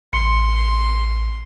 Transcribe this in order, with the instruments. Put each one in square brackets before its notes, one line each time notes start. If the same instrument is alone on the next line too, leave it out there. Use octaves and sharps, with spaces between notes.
[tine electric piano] A1 C#7 [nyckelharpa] C6